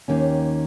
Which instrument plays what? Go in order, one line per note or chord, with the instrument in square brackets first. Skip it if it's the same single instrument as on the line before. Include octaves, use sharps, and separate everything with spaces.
[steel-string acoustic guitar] D#2 D#3 A#3 C#4